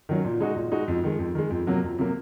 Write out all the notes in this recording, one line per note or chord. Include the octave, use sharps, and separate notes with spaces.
D#3 F#3 C#4
A#2
G#3 D#4 F#4
A#2
G#3 D#4 F#4
F2
D#3 G#3
F2
D#3 G#3
F2
C3 F#3 A#3
F2
C3 F#3 A#3